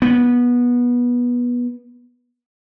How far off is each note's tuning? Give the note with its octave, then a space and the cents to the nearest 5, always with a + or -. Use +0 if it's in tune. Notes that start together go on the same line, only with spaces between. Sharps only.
B3 -20